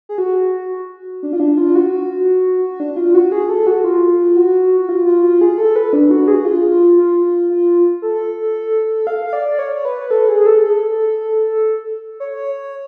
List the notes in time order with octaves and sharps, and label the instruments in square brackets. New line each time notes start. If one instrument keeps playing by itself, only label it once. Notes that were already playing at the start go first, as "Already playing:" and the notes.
[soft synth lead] G#4
F#4
D4
F4
D4
F4
F#4
D4
F4
F#4
G#4
A4
F#4
F4
F#4
F4
F4
F4
G#4
A4
B4
D4
F#4
G#4
F4
F4
F4
A4
F5
F5
D5
C#5
B4
A4
G#4
A4
C#5